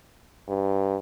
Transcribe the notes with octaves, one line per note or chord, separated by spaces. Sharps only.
G2